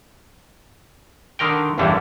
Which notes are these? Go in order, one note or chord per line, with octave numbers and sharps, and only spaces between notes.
D3 D#3 A#4 G5
A1 E2 G2 D3 E3 G3